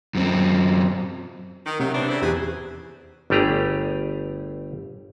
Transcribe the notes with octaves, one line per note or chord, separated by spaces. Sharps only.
F#2 C4
D#3
C3 D#3 F#3
B3 C4 D4
C#3 C4 E4
E2 G4 G#4 B4 C5
G1 G3 A3 G4 G#4 A#5